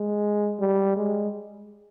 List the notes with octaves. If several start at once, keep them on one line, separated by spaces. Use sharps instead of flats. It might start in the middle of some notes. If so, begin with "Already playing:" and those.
Already playing: G#3
G3
G#3